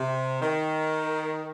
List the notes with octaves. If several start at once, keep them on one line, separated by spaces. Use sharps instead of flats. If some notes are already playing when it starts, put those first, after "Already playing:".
Already playing: C3
D#3